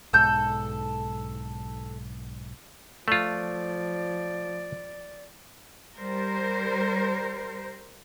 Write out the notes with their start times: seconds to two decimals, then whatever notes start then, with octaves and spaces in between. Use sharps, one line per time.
0.13 B1 G#2 A4 G6
3.08 F3 A3 F4 D5
5.99 G3 A#4 C5